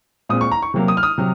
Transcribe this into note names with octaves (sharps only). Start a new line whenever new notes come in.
A#2 G#3 C4 D#6
C#6
A#5
C#6
C3 F#3 A#3
D#6
F6
D#6
C3 F#3